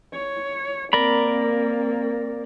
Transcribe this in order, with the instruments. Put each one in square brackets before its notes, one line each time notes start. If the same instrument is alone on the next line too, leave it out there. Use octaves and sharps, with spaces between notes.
[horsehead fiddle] C#5
[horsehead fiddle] A#3 C4 [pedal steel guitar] A#4 D5 B5